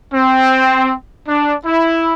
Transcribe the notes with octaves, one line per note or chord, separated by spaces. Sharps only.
C4
D4
E4